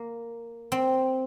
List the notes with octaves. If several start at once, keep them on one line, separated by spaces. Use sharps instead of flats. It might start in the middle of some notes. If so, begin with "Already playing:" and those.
Already playing: A#3
C4